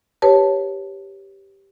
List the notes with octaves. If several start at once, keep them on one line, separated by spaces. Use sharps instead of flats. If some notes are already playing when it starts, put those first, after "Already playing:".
G4 B4 C#5 A5